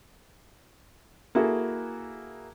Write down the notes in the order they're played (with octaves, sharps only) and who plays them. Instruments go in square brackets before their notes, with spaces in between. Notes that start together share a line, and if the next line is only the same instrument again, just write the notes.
[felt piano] A#3 E4 F#4 G#4 A4